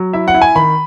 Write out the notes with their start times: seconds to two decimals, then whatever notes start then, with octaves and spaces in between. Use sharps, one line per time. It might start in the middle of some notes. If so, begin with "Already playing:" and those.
Already playing: F#3
0.13 E4 E5
0.28 F#5
0.34 E4
0.42 G#5
0.55 D#3 B5